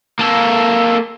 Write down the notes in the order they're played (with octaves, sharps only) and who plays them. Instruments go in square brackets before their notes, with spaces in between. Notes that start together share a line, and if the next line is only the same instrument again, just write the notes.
[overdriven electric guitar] A#3 A4